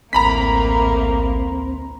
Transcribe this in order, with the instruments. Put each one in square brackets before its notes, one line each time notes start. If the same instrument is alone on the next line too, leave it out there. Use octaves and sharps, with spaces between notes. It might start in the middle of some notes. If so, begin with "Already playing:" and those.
[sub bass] A1 [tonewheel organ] D2 C4 [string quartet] A2 A#3 [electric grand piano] A#5 B5 B6